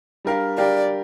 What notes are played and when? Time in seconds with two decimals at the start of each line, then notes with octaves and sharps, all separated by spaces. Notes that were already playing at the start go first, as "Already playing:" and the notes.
0.25 G3 D4 G4 A#4 F5
0.58 G3 D4 G4 A#4 D5 F5